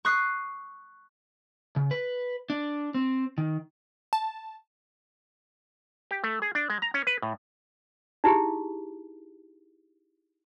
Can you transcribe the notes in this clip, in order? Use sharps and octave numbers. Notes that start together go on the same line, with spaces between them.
C#6 D#6 F#6 C7
C#3
B4
D4
C4
D#3
A5
G4
A3
G#4
D4
G#3
A#5
C#4
B4
A2
D#4 E4 G4 G#4